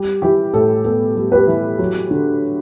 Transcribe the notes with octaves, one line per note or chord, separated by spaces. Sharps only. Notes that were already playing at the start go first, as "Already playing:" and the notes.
Already playing: G3 G4
E3 G4
A2 A4
B3 A4
G3
G4 B4
E3
F#3
D3